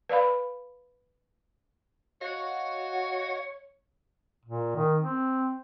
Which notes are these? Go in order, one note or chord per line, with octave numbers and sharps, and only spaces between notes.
B4 D5 F5 B5
F#4 C#5 D#5 F5
A#2
D#3
C4